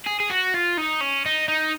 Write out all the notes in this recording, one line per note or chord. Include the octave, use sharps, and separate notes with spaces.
G#4
G#4
F#4
F4
D#4
C#4
D#4
D#4